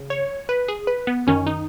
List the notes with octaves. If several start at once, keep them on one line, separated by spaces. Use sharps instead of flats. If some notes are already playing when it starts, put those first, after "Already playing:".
Already playing: C#3
C#5
B4
G#4
B4
B3
F#2 D#3 C#4
D#4